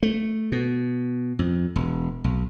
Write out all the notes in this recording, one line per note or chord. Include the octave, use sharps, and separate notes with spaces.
A3
B2
F2
E1
B1